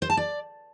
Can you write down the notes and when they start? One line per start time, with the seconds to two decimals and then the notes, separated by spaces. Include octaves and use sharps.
0.02 C5
0.10 A5
0.17 D5